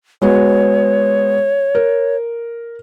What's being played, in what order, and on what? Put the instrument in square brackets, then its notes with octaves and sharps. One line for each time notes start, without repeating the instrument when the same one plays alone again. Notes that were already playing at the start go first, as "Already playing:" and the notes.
[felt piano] G#3 B3 F#4 [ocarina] C#5
[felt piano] A#4